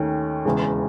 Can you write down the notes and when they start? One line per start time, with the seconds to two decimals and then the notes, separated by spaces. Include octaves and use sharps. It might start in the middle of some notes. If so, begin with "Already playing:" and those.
Already playing: D#2 D#3 A3 C#4
0.45 E1 E2 C#3 E3 G#3